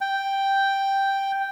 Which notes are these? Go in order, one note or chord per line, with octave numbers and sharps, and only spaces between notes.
G5